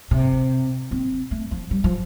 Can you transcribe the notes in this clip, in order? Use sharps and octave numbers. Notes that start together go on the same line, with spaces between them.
C3
C4
A3
F3
G3
F3